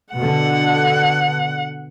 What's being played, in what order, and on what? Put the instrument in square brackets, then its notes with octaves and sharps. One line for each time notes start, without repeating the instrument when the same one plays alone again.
[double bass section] B2 D3 [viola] F#5